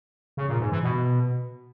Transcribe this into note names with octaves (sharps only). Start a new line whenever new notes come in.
C#3
A#2
G#2
E3
B2